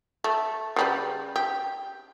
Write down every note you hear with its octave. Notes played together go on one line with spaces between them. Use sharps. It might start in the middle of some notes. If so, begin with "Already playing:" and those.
A3
C#3 G3 B4
G4